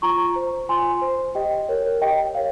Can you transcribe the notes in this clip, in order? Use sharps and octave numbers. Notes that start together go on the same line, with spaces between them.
F4 A#5 C#6
C5
F4 G#5 C6
C5
G4 D#5 G5
A#4 C#5
G4 D#5 G5
A#4 C#5 F5